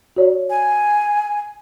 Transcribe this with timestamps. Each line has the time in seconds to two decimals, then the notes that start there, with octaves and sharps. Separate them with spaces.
0.16 F#4 C#5 D5
0.50 G#5